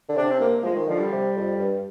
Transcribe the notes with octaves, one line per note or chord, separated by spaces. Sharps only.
D3
C3 D4
C4
A#3
F3 G#3
D#3
D3 F3
G3
C3
F2
G2